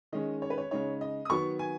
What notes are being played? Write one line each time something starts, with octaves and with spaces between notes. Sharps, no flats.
D#3 G#3 C#4 D#5
C#5
B4
C#5
C#3 G#3 D#4 C#5
D#5
D#6
D#3 F#3 B3 C#6
G#5